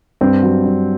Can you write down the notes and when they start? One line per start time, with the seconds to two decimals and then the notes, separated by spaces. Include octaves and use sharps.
0.21 G2 C4
0.43 F#3
0.65 G2